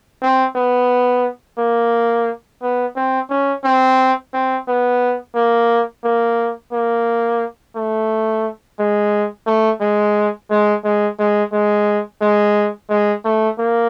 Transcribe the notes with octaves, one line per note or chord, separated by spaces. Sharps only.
C4
B3
A#3
B3
C4
C#4
C4
C4
B3
A#3
A#3
A#3
A3
G#3
A3
G#3
G#3
G#3
G#3
G#3
G#3
G#3
A3
A#3